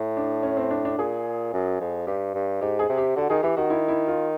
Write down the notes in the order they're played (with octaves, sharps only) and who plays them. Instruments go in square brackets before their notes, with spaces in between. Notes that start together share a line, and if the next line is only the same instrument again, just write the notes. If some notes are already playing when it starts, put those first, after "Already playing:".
Already playing: [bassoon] A2
[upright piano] D4
C#4
C4
D4
D4
[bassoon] A#2 [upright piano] G#4
[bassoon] F#2
F2
[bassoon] G2 [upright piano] G4
[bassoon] G2
[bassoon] G#2 [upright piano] G4
[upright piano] G#4
[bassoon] C3
[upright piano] G4
[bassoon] D3 [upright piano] F#4
[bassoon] D#3 [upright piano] G#4
[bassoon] E3 [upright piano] G4
[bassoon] D#3 [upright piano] F#4
[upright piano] E4
E4
F4